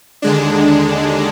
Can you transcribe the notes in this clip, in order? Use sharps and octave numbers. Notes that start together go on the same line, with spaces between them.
D#2 D3 G#3 D4